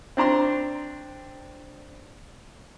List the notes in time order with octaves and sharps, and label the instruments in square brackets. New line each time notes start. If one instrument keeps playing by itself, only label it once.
[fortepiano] C4 D4 A#5 C6